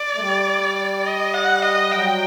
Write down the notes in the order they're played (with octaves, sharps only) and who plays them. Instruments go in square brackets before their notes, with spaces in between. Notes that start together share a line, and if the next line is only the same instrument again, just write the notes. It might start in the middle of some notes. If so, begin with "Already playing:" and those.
Already playing: [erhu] D5
[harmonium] A3
G3
[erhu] D#5
F#5
D#5
[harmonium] F#3 [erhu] G5